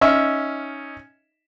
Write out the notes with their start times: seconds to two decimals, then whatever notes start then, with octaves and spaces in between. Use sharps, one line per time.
0.01 C#4 D#4 D#5 E5 F6